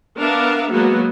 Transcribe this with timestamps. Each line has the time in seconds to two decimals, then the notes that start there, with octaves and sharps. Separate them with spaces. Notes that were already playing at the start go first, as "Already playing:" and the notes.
0.19 B3 D4 A#4 E5 F5
0.72 F#3 G#3 A#3 B3 F#4